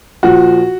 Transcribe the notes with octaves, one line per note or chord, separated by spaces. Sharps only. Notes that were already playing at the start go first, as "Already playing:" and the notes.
A#2 F3 F#4